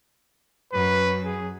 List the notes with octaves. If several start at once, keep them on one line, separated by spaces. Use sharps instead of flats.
F#2 B4
G#4